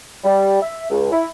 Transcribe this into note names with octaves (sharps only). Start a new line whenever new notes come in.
G3
E5
C#2
E4